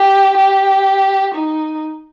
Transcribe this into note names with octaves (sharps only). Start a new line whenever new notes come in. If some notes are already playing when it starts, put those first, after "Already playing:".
Already playing: G4
G4
D#4